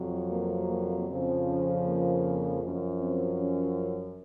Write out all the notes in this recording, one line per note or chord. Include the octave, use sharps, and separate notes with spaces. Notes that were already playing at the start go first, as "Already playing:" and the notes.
Already playing: F2 C3 F#3
A#3
A#3
F2 C#3 F3 C4
C#4
A#3
F#2 F3
C4
C#4